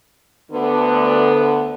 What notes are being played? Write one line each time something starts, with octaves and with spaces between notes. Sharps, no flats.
D2 D3 B3